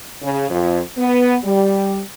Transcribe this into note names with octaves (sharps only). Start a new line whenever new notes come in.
C#3
F2
B3
G3